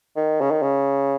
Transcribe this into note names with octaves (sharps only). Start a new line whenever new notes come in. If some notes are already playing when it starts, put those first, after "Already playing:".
D#3
C#3
D#3
C#3